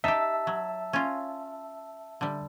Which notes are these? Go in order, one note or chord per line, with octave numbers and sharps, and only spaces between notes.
D#4 G4 E5 A5 E6
F#3
C#4 F4
D3 G3